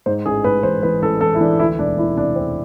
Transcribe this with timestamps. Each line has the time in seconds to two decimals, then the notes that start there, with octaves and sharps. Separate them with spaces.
0.06 G#2 C5
0.26 A1 G#4
0.44 G#2 B4
0.63 E3 C5
0.83 E3 B4
1.02 A1 A4
1.21 E3 A4
1.35 E4
1.41 E3 D4
1.59 D2 E4
1.79 E1 D4
1.98 E1 E4
2.17 C3 D4
2.35 E1 C4